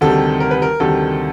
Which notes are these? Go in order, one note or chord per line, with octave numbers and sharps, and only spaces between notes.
D2 C3 D#3 G3 A4
A#4
B4
A#4
D2 C3 D#3 G3 A4